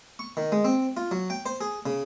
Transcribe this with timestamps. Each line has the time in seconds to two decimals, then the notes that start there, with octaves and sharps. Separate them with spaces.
0.19 C#6
0.37 D#3
0.52 G#3
0.65 C4
0.97 F4
1.11 F#3
1.30 G5
1.46 C5
1.61 G#4
1.86 C#3